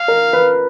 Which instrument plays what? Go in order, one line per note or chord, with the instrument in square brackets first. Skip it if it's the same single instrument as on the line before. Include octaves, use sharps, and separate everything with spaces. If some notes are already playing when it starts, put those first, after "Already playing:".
Already playing: [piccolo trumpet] F5
[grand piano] A#4
B4